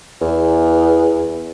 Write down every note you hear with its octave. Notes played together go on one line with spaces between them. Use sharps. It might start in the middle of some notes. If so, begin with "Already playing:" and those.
E2